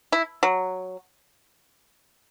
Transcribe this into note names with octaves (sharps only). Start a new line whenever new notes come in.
E4
F#3